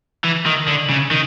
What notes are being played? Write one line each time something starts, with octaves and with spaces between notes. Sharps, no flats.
E3
D#3
D3
C#3
D#3